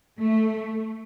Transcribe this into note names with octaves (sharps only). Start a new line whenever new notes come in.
A3